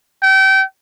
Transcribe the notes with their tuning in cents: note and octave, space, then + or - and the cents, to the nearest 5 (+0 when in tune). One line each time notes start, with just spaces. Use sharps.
G5 -30